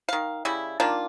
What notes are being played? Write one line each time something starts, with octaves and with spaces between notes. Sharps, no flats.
D#3 F5
C#3 G3 E4
D#3 A#3 D4 F4